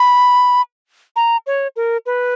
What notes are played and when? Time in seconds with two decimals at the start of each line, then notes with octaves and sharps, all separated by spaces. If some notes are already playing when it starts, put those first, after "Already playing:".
Already playing: B5
1.16 A#5
1.47 C#5
1.76 A#4
2.06 B4